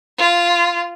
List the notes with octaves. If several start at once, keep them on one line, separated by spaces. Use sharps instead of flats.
F4